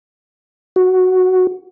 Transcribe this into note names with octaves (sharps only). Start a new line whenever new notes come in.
F#4